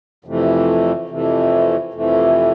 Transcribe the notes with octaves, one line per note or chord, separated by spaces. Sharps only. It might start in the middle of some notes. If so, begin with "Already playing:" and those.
F2 C3 E3 A3
F2 C3 E3 A3
F2 C3 E3 A3